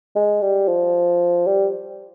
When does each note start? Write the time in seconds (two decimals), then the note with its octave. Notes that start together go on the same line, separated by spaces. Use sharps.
0.16 G#3
0.42 G3
0.68 F3
1.47 G3